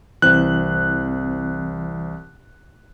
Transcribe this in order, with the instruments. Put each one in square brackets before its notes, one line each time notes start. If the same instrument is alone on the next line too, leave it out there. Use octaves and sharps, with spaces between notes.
[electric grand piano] C2 F#6 [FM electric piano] E3 C4